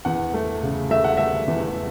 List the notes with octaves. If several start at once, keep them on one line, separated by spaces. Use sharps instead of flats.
E2 F#5
A3
C#3
A3 E5
F#5
A3 E5
E2